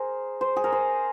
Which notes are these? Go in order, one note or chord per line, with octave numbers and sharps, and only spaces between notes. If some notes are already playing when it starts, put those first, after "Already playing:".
Already playing: G#4 A#4 C5
C5
G#4
A#4
C5